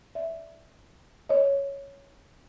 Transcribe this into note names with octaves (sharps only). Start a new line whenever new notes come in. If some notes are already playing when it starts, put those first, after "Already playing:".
D5 E5
C#5 D#5